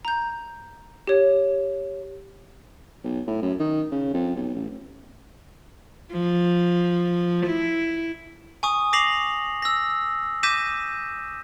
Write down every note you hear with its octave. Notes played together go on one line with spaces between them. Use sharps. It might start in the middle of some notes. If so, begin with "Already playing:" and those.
A#5 G6
G4 C#5
B1
A2
F#2
D#3
C#3
F2
B1
A1
F3
E4
G#5 C#6 D#6
D6 A#6 C7 F7 F#7
E6 A#6
D6 G6 A#6 B6 D#7 E7